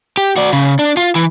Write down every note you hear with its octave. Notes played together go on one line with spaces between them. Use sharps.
G4
F#4 D5
C#3
D4
F4
E3